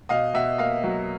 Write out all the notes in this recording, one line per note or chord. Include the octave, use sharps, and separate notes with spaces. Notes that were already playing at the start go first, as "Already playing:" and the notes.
B2 D#5 F5
B2 E5 F#5
A#3 D#5 F5
F#3